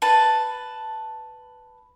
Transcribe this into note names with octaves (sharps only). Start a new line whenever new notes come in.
B4 A5